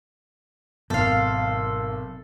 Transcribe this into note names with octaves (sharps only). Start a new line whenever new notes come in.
G#1 B2 F#3 A4 F5